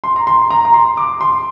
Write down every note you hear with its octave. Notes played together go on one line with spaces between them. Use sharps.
C6
A#5
C6
A#5
A#5
C6
D6
C6